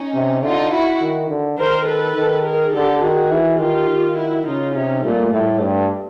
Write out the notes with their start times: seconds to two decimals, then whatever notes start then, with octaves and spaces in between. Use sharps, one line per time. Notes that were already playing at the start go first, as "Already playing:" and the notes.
Already playing: C#4 D#4
0.15 C3
0.43 D3 D#4 F4
0.72 E4 F#4
1.01 D#3
1.30 D3
1.59 D#3 A#4 C5
1.87 A4 B4
2.16 D#3
2.45 G#4 A#4
2.73 D3 G4 A4
3.03 D#3 F#4 G#4
3.32 E3
3.60 D#3 F4 G4
3.89 D#3
4.17 E4 F#4
4.47 C#3 D#4 F4
4.75 C3 C#4 D#4
5.04 A#2 G3 A3
5.33 A2 G3 A3
5.62 G2